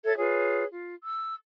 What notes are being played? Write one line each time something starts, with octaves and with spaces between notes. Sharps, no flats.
A4 C#5 E5 G#6
F4 G#4 B4 C#5
F4
E6